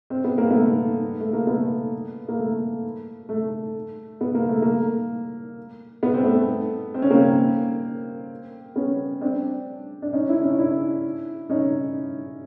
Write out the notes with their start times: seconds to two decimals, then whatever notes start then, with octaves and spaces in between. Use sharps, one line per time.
0.10 C4
0.24 B3
0.38 A#3
0.51 A3 B3
1.20 A3
1.33 A#3
1.47 A3 B3
2.28 A#3
2.39 A3
3.29 A3
4.21 B3
4.34 A#3
4.48 A3
4.62 A#3
6.03 B3
6.14 C4
6.24 A3 B3
6.94 C4
7.02 C#4
7.10 A#3 C4
8.76 B3 C#4
9.21 C4 D4
10.02 D4
10.13 C#4 D#4
10.28 D4 E4
10.43 C#4 D#4
10.58 D4 E4
11.49 C#4 D#4